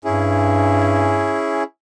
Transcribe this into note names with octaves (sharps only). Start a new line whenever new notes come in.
G2 C#4 E4 G#4